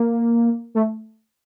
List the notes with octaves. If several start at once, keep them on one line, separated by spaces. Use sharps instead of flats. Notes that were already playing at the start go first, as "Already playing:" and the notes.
Already playing: A#3
A3